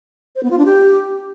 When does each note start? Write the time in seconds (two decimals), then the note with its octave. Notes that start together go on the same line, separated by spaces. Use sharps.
0.36 C5
0.43 B3
0.51 F4
0.58 D4
0.65 G4